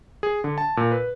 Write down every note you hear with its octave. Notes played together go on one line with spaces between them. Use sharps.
G#4
D3
A5
A#2
B4